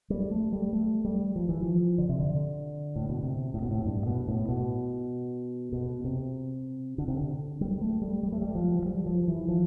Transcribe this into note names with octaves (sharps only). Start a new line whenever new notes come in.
G3
A3
G3
A3
G3
F3
E3
F3
D3
C3
D3
A2
B2
C3
A2
B2
A2
G2
B2
A2
B2
B2
C3
D3
C3
D3
G3
A3
G3
G3
A3
G3
F3
F3
G3
F3
E3
F3